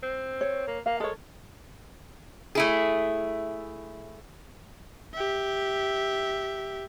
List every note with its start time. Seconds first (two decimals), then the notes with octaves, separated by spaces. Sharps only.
0.03 C4
0.41 C#5
0.67 A#3
0.86 A#3 F5
1.00 G#3 A4 A#4 C#5
2.55 A3 E4 G#4
5.14 G4 E5